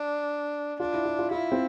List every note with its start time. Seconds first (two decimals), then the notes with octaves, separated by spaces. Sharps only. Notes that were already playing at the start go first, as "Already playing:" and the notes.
Already playing: D4
0.80 D4 F4
0.93 E4
1.05 F4
1.19 F4
1.31 E4 F4
1.52 C4